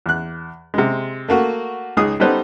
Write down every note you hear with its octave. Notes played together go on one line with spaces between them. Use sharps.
E2 F#6
C3 G#3
A3 A#3 F#4
C#2 D#4 G#4 D#6
G3 B3 D#4 A4 B4 C5